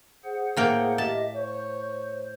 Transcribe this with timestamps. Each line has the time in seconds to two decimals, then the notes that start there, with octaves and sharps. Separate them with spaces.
0.24 G#4 C5 F#5
0.57 A2 A#3 G5
0.98 G4 D#5 E5 A5
1.36 C5 C#5